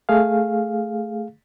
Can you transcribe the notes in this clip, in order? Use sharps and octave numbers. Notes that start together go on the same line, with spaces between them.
A3 G#4 F5